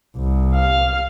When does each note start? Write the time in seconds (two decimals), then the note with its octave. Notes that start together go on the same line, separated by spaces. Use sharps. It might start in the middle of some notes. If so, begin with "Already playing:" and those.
0.17 C2
0.54 F5